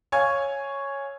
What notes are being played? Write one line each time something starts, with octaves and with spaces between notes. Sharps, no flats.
C#5 F5 G#5 C#6 G#6